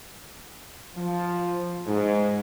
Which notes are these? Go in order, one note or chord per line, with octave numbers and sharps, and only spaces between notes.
F3
G#2